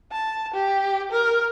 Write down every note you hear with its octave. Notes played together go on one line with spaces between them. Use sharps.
A5
G4
A#4